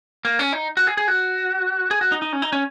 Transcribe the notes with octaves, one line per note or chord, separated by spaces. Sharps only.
A#3
C#4
D#4
F#4
G#4
G#4
F#4
G#4
F#4
D#4
D#4
C#4
D#4
C#4